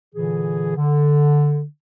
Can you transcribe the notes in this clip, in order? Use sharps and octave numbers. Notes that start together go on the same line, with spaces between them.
A#2 D3 E3 G#4
D3